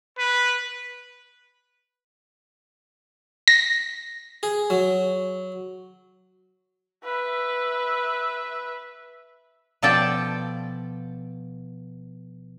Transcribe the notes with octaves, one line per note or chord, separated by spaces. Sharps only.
B4
A#6
G#4
F#3
B4 E5
B2 F3 A4 D5 G5 A5